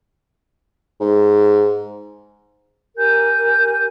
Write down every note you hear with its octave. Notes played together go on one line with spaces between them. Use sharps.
G#2
G4 A#4 G#5 G6